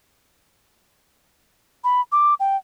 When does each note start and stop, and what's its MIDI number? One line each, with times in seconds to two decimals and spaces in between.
1.84 2.01 83
2.12 2.34 86
2.40 2.57 79